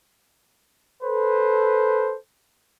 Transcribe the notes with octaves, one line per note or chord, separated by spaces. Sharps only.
A4 B4 C5